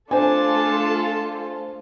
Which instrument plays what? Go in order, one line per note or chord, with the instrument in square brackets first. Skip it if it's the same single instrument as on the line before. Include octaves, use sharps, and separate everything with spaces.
[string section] A3 F4 A4 [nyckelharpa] D4 A5 [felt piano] C5 G#5